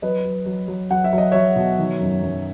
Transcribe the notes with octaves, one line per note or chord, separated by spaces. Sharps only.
F#3 B4 D#5
F#3
F#3
F#3
F#3 F#5
E5
F#3
D#5
F#3 C#5 E5
B2
D#3
F#2
F#2